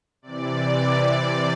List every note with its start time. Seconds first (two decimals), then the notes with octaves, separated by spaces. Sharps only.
0.22 C3 E3 D5